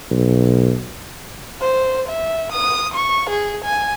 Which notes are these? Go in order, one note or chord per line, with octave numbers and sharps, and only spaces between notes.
B1
C5
E5
D#6
C#6
G#4
G#5